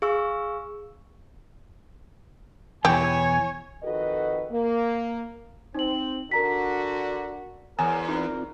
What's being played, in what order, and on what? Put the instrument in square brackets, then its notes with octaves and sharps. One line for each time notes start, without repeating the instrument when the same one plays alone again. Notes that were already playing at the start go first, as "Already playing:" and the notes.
[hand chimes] G#4 F5 C#6 E6
[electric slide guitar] E2 B2 E3 [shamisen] G4 [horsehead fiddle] C#5 [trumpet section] G#5
[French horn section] F2 D#3 F#4 A4 B4 D#5
A#3
[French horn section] C4 [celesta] D#4 F#7
[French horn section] D3 D4 F#4 [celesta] A#4 A#5 B6
[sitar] E2 [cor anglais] A#4 [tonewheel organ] C#5 F#5 [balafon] G#5
[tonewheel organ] C4 F4 D5 [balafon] D#4 [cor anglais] A#4